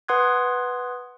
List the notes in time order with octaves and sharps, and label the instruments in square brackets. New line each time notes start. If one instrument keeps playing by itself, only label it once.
[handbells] B4 F#5 C6 D#6 F#6 G#6